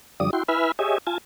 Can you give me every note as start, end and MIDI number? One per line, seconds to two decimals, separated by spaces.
0.20 0.31 42
0.20 0.31 50
0.20 0.31 53
0.20 0.31 55
0.20 0.31 74
0.20 0.31 87
0.33 0.43 64
0.33 0.43 66
0.33 0.43 79
0.33 0.43 84
0.48 0.72 64
0.48 0.72 71
0.48 0.72 76
0.48 0.72 80
0.48 0.72 83
0.48 0.72 89
0.79 0.98 67
0.79 0.98 68
0.79 0.98 73
0.79 0.98 75
0.79 0.98 76
0.79 0.98 80
1.07 1.18 65
1.07 1.18 80
1.07 1.18 81